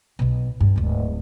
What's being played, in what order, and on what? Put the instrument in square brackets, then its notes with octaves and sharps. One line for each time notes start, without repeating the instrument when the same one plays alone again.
[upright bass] B1 B2
G2
D1 G#1